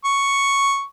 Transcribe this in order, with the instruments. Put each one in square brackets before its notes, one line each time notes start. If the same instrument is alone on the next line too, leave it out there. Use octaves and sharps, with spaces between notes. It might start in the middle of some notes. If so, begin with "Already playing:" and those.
[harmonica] C#6